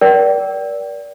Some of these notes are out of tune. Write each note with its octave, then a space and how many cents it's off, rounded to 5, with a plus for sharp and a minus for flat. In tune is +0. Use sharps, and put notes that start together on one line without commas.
A#4 +35 D5 -20 G5 -35